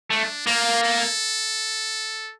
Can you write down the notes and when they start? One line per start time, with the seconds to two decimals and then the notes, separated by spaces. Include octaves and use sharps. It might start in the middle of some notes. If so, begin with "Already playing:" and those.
0.11 A3 D4
0.47 A#3 F4
0.83 A4